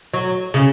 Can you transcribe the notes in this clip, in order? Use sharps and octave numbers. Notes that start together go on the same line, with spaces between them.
F#3
C#3